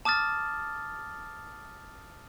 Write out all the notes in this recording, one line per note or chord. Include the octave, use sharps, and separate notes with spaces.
A5 D6 D#6 F6 A6